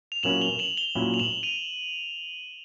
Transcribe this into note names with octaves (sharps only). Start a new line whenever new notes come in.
F7
A#2 F#3 A#3 C#4 E4 E7 F#7
F7 G7
E7 F#7
F7 G7
A#2 F#3 A#3 C#4 E4
F7
E7 F#7
D#7 F7